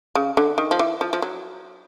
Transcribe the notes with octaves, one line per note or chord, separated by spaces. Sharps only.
C#3
D3
D#3
F3
E3
F3
F3
F#3